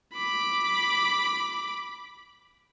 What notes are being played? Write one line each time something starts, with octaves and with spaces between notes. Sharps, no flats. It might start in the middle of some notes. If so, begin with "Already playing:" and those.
B5 D6